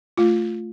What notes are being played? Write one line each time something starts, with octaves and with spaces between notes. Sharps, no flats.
A3 F4